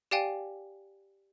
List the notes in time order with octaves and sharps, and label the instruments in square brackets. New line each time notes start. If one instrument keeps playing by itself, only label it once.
[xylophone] G4 D5 F5 G5 G#5